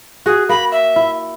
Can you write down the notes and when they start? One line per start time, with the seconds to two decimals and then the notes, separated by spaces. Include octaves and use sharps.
0.26 F#4 G#4
0.49 A#3 B5
0.72 E5
0.96 E4